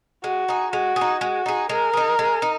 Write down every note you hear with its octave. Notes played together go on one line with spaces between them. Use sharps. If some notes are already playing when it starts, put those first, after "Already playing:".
G#3 F#4
D#4 G#4
G#3 F#4
G#4
D#4
G#3 F#4
D#4 G#4
G#3 A#4
D#4 G#4
G#3
D#4